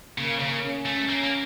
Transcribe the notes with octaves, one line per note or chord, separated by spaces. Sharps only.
C#3 A#3
C#3
C#4
A3
A#3
A#3